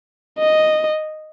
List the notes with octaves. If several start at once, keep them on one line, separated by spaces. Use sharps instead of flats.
D#5